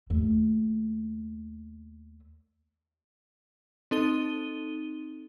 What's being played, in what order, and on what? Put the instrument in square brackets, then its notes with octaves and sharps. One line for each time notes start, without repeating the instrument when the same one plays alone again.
[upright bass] D#2 A3
[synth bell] C4 D#4 A4 D#7 G7